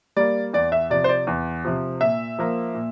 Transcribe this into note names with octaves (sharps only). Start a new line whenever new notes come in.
G3 A#3 D5
E2 D5
E5
C3 F3 D5
C5
D5
E2
C3 F3
A#2 E5
F3 A#3
A#2